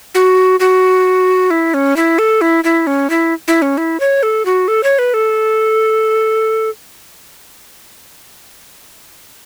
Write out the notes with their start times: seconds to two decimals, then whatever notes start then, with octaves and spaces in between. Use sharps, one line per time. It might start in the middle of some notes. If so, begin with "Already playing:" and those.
0.15 F#4
0.60 F#4
1.51 E4
1.74 C#4
1.96 E4
2.19 A4
2.41 E4
2.64 E4
2.87 C#4
3.10 E4
3.48 E4
3.62 C#4
3.78 E4
4.00 C#5
4.23 A4
4.45 F#4
4.68 A4
4.84 C#5
4.99 B4
5.14 A4